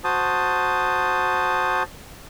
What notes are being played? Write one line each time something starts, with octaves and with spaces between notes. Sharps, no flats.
F#4 C5 A5 D#6